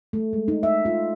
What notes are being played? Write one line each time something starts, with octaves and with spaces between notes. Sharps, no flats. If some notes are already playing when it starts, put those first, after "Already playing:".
A3
G#3
D#4
E5
F4